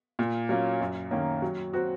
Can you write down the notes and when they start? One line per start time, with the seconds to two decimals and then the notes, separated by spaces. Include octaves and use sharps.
0.19 A#2
0.49 F#3 A#3 C#4 F4
0.81 F#2
1.11 D#3 A#3 C#4
1.42 F#3
1.73 C4 F#4